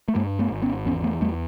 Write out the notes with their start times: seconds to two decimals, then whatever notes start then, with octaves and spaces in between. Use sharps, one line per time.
0.08 A3
0.15 G2 G#3 A#3
0.39 A3 B3
0.51 G#1
0.62 B3 C#4
0.86 E2 B3 C#4
1.04 A3 B3
1.21 E2 G3 A3